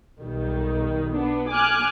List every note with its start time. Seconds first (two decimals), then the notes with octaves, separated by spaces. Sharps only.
0.20 B1 D#3 G3
1.10 B3 D4
1.50 G#5 D6 F6 F#6